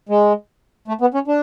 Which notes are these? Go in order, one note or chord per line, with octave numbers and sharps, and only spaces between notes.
G#3
A3
B3
C#4
D4